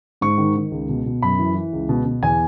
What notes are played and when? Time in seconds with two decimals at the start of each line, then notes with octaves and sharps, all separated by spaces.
0.21 G#2 C#6
0.38 D#3
0.56 D#3
0.71 C#2
0.89 B2
1.06 B2
1.22 F#2 B5
1.39 E3
1.55 E3
1.73 C#2
1.89 B2
2.05 B2
2.22 E2 G#5